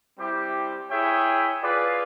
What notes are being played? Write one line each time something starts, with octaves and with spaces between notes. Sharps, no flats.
G3 C4 E4 G4
E4 G#4 C#5 E5 G5
F4 G#4 B4 D5